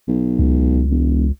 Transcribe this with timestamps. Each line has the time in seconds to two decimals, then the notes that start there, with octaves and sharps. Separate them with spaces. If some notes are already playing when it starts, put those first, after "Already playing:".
0.08 B1
0.39 C#2
0.91 E1